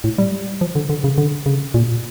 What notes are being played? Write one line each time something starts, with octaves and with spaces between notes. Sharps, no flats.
A2
G3
F3
D3
D3
C#3
D3
C#3
A#2